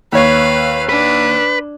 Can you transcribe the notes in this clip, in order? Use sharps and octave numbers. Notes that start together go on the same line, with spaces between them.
D#2 B4 C#5 F5
D4 B4